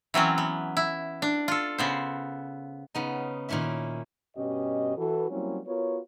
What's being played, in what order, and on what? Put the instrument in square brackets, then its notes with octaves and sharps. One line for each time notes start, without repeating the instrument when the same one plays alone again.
[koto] E3 F#3 C4 C#4
B3
E4
D4
F4 A4
C#3 B3 C5
[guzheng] C#3 B3 D#4
A#2 D#3 C#4 E4 E5
[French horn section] G2 B2 C#4 G4 D#5
E3 F#4 A4
F#3 G3 A#3 C4 C#4 E4
B3 F4 F#4 A#4 C#5